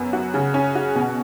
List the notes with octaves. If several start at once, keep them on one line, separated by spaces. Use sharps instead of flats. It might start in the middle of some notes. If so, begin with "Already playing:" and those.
Already playing: F#2 B3
F#4
C#3
C#4
F#4
B2